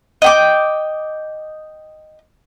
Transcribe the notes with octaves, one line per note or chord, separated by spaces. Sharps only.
D#5 G5 D6